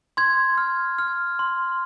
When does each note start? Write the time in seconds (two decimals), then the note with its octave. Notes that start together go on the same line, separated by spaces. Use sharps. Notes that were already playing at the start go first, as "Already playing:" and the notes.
0.17 C6 G#6
0.58 F6
0.98 F6
1.39 C6